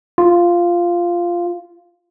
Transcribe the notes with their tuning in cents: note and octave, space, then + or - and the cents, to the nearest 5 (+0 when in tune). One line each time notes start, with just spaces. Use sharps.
F4 -5